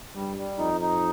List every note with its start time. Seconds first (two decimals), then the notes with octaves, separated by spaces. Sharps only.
0.15 G2 G3
0.37 G3
0.58 F2 D#4
0.81 D#4